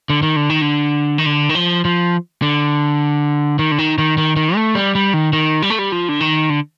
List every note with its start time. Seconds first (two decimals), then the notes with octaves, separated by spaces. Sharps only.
0.10 D3
0.23 D#3
0.36 D3
0.50 D#3
0.61 D3
1.18 D#3
1.26 D3
1.49 D#3
1.55 F3
1.85 F3
2.42 D3
3.59 D#3
3.72 D3
3.79 D#3
3.98 D#3
4.18 D#3
4.36 D#3
4.55 A3
4.75 G3
4.95 G3
5.14 D#3
5.33 D#3
5.62 G3
5.70 A3
5.79 G3
5.92 F3
6.09 D3
6.20 D#3
6.50 D3